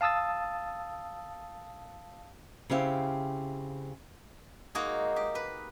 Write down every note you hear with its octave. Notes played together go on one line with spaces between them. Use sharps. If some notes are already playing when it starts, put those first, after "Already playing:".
F5 A5 D#6 E6 A6
C#3 C4 E4 G4 F5
G#3 A#3 D#4 F#4 G#4
G4
B4